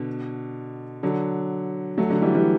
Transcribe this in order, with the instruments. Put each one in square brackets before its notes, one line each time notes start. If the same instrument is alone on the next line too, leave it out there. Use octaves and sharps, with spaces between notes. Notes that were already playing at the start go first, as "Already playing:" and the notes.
Already playing: [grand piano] B2 D3
D3 F#3
F#3 A3
D3 F#3
E3 G3
E3 G3